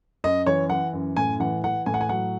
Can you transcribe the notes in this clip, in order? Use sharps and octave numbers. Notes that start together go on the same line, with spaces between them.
F#2 D#5
E3 C#5
E3 F#5
F#2
A2 G#5
E3 F#5
E3 F#5
A2 G#5
F#5
G#5
F#3 F#5